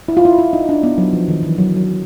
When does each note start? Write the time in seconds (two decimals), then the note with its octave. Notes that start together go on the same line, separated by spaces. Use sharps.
0.08 E4
0.17 F4
0.25 E4
0.38 E4
0.53 D#4
0.69 D4
0.83 B3
0.98 F#3
1.13 F3
1.28 D#3
1.43 E3
1.58 F#3
1.77 F#3